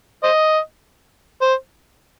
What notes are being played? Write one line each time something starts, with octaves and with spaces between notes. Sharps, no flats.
C5 D#5
C5